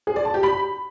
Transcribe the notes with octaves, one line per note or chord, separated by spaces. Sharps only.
G#4
D5
A5
G4
B5